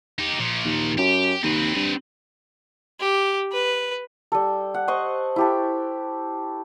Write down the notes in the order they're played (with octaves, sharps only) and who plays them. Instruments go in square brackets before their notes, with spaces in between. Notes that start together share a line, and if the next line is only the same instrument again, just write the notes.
[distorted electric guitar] D#4 G4
A#2 F3
[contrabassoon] D#2
[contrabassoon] F#2 [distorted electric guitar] G4
[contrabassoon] D#2 [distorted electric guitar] C4 B4
[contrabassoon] G2
[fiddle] G4
B4
[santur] G3 A4
F#5
C5 D#5 F#5 C#6
E4 G4 A4